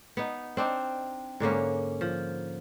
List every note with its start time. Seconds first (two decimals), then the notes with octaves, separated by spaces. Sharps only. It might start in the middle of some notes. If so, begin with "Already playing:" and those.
0.17 B3 D#4
0.57 C4 D4 D#4
1.40 G#2 D3 A#3 C#4
2.01 F3